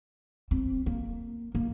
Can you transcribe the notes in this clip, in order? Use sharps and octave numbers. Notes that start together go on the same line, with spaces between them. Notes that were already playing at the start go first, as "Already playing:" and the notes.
C4
A#3
A#3